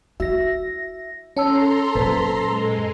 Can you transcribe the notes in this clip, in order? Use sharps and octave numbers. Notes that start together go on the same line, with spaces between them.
E4 F#4 E5 A#6
C#4 A4 C#5 A5 A#5 C6 E6
F#2 A#2 B4 C5
G#3